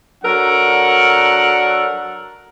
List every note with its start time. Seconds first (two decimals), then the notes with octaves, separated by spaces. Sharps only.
0.23 F#3 D4 A4 A#4 F#5